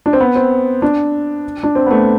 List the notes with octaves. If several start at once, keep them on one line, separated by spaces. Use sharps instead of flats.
D4
C4
B3
C4
D4
D4
C4
B3
A3